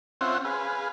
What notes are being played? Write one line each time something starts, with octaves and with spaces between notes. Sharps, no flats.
C4 C#4 F4 C5 E5 F#5
G#4 B4 F5